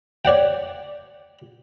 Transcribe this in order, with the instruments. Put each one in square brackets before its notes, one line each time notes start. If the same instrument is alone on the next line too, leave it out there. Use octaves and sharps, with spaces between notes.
[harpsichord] C#5 D5 F#5 G5